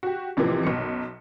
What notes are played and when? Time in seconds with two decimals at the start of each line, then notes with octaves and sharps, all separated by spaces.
0.03 F#4 G4
0.37 A1 C3 E3 F3 A#3 D6
0.63 B1 F#2 C#7